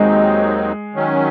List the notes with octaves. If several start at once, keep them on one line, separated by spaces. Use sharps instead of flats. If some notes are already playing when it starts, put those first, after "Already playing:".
Already playing: D#2 D#3 F#3 G#3 C4 D#4
D#3 F#3 C#4